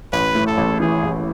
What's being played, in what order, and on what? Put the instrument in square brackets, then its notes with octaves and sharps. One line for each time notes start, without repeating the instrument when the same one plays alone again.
[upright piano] A1 [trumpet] B4
[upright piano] A2
[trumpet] A4
[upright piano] A1
[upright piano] E3 [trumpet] G#4
[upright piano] A1